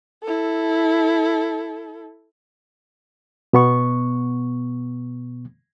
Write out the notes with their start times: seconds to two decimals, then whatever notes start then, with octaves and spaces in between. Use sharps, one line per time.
0.23 E4 A4
3.53 B2 B3 C#6